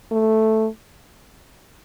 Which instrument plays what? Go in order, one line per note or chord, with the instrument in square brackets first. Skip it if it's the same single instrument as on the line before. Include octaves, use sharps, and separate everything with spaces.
[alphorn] A3